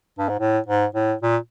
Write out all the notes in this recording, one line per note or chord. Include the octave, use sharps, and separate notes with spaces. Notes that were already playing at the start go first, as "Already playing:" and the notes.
G2
G#2
A2
G#2
A2
A#2